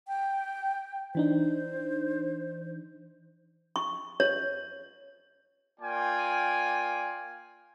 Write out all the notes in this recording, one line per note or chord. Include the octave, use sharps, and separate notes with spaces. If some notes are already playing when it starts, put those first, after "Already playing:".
G5
E3 D4 D#4 C5
C#6
C#5
A#3 F4 D5 G5 G#5